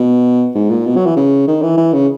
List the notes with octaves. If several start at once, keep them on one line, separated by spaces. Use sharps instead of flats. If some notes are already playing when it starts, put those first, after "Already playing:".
Already playing: B2
G#2
A#2
B2
F#3
E3
C#3
D#3
E3
E3
C#3